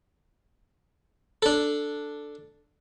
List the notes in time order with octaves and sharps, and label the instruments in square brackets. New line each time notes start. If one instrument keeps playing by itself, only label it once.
[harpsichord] D4 A4